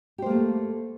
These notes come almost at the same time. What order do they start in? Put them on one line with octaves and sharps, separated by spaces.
G4 C5 A#3 A3